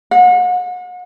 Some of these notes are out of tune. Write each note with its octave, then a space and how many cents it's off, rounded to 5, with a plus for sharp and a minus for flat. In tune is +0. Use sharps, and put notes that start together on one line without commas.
F#5 -40